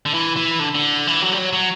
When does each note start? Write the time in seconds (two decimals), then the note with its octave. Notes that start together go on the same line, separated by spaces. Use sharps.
0.06 D3
0.14 E3
0.36 E3
0.60 D3
0.75 D3
1.07 E3
1.22 F#3
1.33 G3
1.38 F#3
1.53 F#3